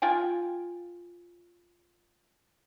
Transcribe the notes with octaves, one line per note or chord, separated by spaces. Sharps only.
F4 G5 G#5